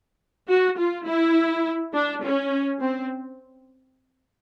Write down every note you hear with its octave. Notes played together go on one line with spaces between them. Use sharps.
F#4
F4
E4
D4
C#4
C4